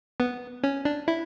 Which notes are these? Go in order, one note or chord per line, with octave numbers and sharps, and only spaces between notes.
B3
C#4
D4
E4